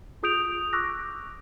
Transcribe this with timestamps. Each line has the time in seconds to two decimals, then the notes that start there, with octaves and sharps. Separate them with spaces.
0.23 F4 G#4 D#6 G6 D7 F7
0.73 C#6 D6 E6 F#6 A#6